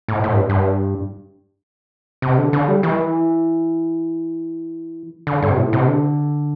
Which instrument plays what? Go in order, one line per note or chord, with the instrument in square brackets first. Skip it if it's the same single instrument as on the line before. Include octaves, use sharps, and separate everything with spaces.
[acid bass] A2
A2
G2
G2
C3
D3
D3
G3
E3
D3
G2
C3
A2
C3
D3